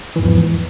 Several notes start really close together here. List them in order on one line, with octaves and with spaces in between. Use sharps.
E3 G#2 E2 F3